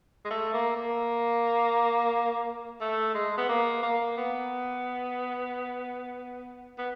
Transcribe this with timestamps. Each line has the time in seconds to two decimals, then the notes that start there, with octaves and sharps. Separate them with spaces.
0.25 G#3
0.30 A3
0.54 A#3
0.76 A#3
2.81 A3
3.14 G#3
3.37 B3
3.49 A#3
3.83 A#3
4.17 B3
6.78 B3